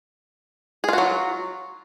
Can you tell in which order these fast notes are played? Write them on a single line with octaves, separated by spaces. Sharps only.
G#4 F4 F#4 F#3